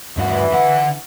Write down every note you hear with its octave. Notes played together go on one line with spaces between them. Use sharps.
G2 E3 D4 F#4
D3 F#5